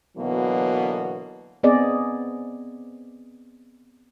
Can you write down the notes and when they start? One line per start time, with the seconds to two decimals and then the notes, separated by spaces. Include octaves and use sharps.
0.17 B2 D3 E3 F#3 A#3 B3
1.63 B3 C4 G#4 D5 D#5